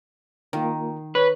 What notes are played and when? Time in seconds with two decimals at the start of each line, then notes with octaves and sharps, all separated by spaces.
0.53 D#3 A#3 F4 A#4
1.15 B4 C#5